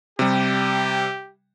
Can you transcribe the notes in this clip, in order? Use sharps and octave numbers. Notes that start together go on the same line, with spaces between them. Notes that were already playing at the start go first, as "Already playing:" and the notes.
C3 G3 G4